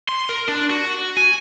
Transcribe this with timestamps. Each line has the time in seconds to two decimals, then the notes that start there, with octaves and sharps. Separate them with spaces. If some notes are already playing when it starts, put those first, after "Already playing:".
0.09 C6
0.29 A#4
0.49 D4
0.70 F#4
1.17 G#5